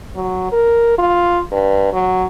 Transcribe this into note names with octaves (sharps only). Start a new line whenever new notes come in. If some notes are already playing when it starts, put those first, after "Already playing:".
F#3
A#4
F4
G2
F#3